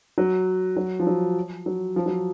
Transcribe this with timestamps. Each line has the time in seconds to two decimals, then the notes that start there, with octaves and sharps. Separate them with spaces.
0.18 F#3
0.77 F#3
1.00 F3
1.07 F#3
1.66 F#3
1.96 F3
2.06 F#3